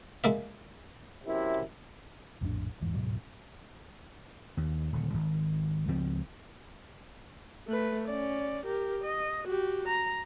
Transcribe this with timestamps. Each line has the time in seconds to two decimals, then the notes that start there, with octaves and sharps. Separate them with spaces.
0.24 G#3 A#3 E5
1.25 F#2 C3 E4
2.41 A#1 F2 A2 D4
2.81 F#1 E2 G#2 E3
2.93 D1 G#2 B2 F#3
4.57 D#2
4.93 D#1 D3
5.14 G#1
5.88 C#2 F3 C4
7.68 A3 B4
8.08 C#4 D5
8.66 G4 A#4
9.04 D#5
9.43 F#4 G4
9.88 A#5